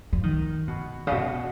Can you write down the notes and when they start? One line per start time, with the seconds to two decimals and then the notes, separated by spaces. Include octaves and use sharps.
0.13 F3
0.23 D#3
0.68 B2
1.07 C#3
1.12 B2